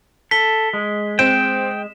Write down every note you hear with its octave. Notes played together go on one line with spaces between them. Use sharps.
A4 B6 G7
G#3
C4 G5 E7